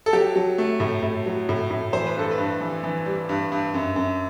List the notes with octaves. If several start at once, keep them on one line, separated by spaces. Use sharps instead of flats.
A4
F#3 G4
F#3
A3
A2
A2
F#3
A2
A2
E3 C5
B4
G2 A4
B4
G2
E3
E3
G3
G2
G2
F#2
F#2